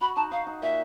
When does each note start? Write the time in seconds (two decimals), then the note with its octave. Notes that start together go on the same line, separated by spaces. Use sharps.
0.01 F#4 B5
0.16 D#4 A5
0.31 D#4 F5
0.47 D#4
0.62 A#2 E5